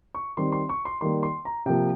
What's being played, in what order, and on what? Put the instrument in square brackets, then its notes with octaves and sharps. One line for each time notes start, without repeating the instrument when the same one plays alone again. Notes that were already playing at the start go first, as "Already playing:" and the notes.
[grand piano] C#6
D#3 G3 C4 C6
C6
C#6
C6
D#3 G3 A#3 C6
C6
A#5
C3 F3 A#3 G5